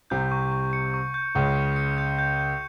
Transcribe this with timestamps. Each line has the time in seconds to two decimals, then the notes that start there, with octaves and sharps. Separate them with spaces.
0.10 C2 C3 G6
0.32 C#6
0.52 C#6
0.73 C#7
0.94 C#6
1.14 G6
1.35 C#2 C#3 C#6
1.56 C#7
1.76 C#7
1.98 G6
2.19 G6
2.39 G6